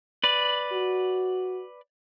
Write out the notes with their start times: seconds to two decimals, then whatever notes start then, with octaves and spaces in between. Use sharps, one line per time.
0.24 B4 D5
0.73 F#4